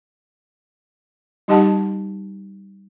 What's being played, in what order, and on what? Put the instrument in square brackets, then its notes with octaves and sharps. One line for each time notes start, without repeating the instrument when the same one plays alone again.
[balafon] G3 D#4 G4 D#5 F#5 A5